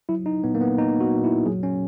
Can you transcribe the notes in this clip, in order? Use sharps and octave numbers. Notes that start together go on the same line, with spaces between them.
F#3 E4
D#4
A#2 B3
A#3
B3
A#3 D#4
F#4
A#2
E4
F#3 G#4
C#4